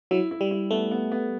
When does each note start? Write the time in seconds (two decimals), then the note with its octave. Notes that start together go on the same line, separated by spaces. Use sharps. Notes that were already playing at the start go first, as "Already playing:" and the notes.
0.11 F#3 E4
0.31 E4
0.41 G3
0.51 E4
0.71 A3 B3
0.91 B3
1.12 B3